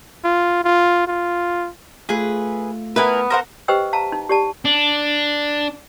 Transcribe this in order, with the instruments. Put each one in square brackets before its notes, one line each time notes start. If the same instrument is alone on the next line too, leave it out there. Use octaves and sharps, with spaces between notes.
[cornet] F4
F4
F4
[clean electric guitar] A3 F4 [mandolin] G#4 B4
[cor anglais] B3 [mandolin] E4 A#4 G#5 [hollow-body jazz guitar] B4
[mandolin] A#4 C5 F#5
[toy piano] G4 B4 C5 D#5 G5 E6
F5 A5 A#5
D#4
G4 D5 A5
[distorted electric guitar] D4